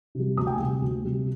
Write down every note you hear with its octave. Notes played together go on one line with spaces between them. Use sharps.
C3 G3
D2 D#6
G5
G#5
C3 G3
D2
C3 G3